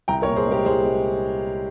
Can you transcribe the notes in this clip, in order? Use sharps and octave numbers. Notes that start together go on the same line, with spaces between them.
C2 G5 A#5
A#4 C#5
A#2
G#4 C5
G#3 G4 A#4
C2 G#4 C5
G#3